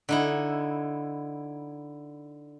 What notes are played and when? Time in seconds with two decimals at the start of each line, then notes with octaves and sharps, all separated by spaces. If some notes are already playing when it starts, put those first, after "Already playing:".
0.09 D3 D#4 E4